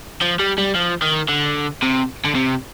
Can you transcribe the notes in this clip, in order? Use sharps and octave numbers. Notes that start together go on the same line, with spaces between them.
F3
G3
G3
F3
D#3
D3
C3
D3
C3